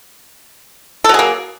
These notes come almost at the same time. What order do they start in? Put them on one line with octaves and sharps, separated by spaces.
A4 F#3 G#4 A#3